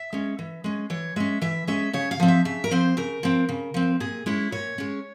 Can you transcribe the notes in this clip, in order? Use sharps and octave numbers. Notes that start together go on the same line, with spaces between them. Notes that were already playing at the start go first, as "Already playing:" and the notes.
Already playing: E5
G#3 C#4
E3
G#3 C#4
E3 C#5
G#3 C#4 E5
E3 E5
G#3 C#4 E5
C#3 C#5
F5
F3 C4
E5
C#3 E5
A#4
F3 C4 C5
C#3 A#4
F3 C4
C#3
F3 C4
A#2 G#4
G#3 C#4 E4
A#2 C#5
G#3 C#4